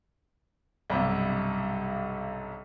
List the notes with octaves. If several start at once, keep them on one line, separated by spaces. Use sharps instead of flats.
B1 G2 C3